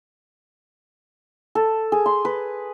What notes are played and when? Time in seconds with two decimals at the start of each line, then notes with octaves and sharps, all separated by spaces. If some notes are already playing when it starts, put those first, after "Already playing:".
1.55 A4
1.92 G#4
2.06 C6
2.25 B4